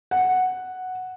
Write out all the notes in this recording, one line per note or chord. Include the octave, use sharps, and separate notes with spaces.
F#5